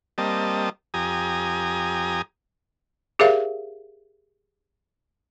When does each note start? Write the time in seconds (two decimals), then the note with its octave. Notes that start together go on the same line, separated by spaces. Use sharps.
0.18 G3 A#3 C4 D#5 A5
0.94 F2 G4 G#5 A#5 D#6
3.19 G4 G#4 A#4 C#5 E5 F5